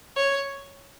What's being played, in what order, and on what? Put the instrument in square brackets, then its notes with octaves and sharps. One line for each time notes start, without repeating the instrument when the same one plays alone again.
[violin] C#5